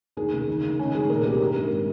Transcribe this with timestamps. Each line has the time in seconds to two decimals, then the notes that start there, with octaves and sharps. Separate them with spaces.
0.17 D#2 G#4
0.32 C#3
0.47 D#3
0.64 D#3
0.79 C#2 C#4
0.94 D#3 G#4
1.10 A#2 A#4
1.25 C2 G4
1.40 G2 A#4
1.55 G#1